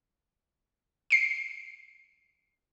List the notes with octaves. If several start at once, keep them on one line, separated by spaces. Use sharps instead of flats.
C7 D7